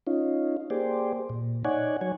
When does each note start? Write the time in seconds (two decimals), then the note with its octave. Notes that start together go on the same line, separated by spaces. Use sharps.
0.07 C#4 D#4 F4
0.70 A#3 G4 G#4 C5 D5
1.29 A#2
1.65 D#4 C#5 D5 F#5 G#5
2.01 F#3 C#5 G#5